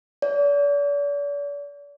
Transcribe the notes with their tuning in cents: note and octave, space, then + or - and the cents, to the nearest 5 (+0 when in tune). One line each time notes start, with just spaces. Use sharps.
D5 -40